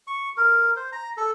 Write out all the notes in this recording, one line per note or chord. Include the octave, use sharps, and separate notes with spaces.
C#6
A#4
C5
A#5
A4